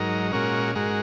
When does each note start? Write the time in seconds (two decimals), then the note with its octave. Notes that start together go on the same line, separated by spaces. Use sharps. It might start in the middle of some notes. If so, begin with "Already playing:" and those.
Already playing: G#2 F#3 D#4 A#4
0.31 A#2 G#3 C#4 F#4 A#4
0.75 G#2 G#3 F#4 A#4